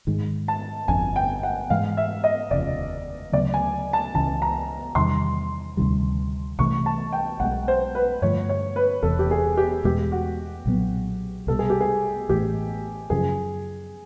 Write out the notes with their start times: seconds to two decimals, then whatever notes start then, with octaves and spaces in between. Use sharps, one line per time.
0.07 G#2 D#3 G#3
0.48 A5
0.88 G1 F2 D3 G#5
1.16 G5
1.43 F#5
1.70 G#2 E3 G#3 F5
1.97 E5
2.24 D#5
2.51 F1 D#2 C#3 F3 D5
3.32 D2 C#3 F#3 B3 D5
3.54 G#5
3.93 A5
4.14 C#2 C#3 E3 A5
4.42 A#5
4.95 E2 C3 D#3 G3 C6
5.77 D2 C3 D#3 G3
6.59 C2 C3 E3 A3 C#6
6.86 A5
7.12 G5
7.40 B1 B2 G#3 F#5
7.68 C5
7.95 B4
8.22 G2 D3 F3 A3 C#5
8.49 C#5
8.76 B4
9.03 E1 E2 C3 A4
9.19 G4
9.31 G#4
9.57 G4
9.84 E2 B2 G#3 G4
10.12 F#4
10.66 B1 A#2 F#3 B3
11.47 C2 B2 G3 A4
11.59 G#4
11.70 G4
11.80 G#4
12.29 A1 A2 E3 G4
13.10 F#2 C#3 F3 G#4